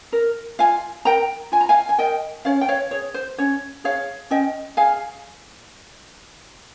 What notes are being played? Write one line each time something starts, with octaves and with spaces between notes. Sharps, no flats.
A#4
F4 F5 G#5
A#4 G5 A#5
F4 G#5
A#5
F5 G#5
G#5
A#4 D#5 G5
C#4 C#5 F5
G5
C#5 F5
G#4 C#5
C5
C#4 C#5
G#4 C#5 F5
C#4 D#5 G5
G#4 F5 G#5